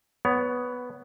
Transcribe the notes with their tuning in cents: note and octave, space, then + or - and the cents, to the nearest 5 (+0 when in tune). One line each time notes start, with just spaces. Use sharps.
B3 +0 C#5 +25